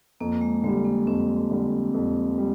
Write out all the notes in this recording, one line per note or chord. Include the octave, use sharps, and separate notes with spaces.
F2 A#3
G#3
D3 G3 G#3
A#3
F2 C4
D3 G3
F2
G3